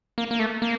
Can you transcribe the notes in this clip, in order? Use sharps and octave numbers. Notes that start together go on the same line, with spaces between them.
A#3
A#3
A3
A#3